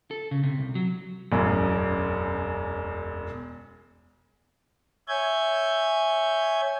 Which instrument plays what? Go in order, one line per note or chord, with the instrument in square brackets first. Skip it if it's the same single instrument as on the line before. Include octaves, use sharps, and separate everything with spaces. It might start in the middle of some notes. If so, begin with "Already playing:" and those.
[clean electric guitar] A4
C#3
C3
C2
F#3
[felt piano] E1 A1 F#2
[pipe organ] C#5 E5 G#5 G6 G#6